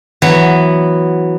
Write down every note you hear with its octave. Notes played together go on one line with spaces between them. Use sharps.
E3 F#3 B3